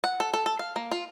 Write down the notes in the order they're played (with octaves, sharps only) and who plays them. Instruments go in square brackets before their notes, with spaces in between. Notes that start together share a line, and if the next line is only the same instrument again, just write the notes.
[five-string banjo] F#5
A4
A4
A4
F5
A#3
F4